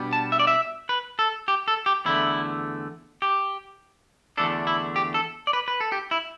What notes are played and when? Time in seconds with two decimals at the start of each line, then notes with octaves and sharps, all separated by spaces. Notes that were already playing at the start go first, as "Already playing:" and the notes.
Already playing: B2 G3 B3 D4
0.13 A5
0.32 E5
0.39 D5
0.47 E5
0.89 B4
1.19 A4
1.48 G4
1.68 A4
1.86 G4
2.06 E2 D3 A3 E4
3.22 G4
4.37 E2 D3 A3 D4 A4
4.67 E4
4.96 G4
5.14 A4
5.47 D5
5.53 B4
5.68 B4
5.80 A4
5.92 G4
6.11 E4